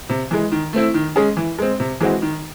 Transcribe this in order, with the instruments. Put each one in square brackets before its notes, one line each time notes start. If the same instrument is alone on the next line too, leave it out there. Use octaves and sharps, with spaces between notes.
[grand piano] C3
E3 G#3
D#3
A3 C4 E4
D#3
G#3 C#4 G#4
E3
G#3 C4
C3
E3 G#3 C4 F#4
D#3